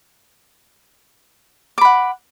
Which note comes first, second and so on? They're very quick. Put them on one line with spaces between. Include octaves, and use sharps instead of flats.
D6 B5 F#5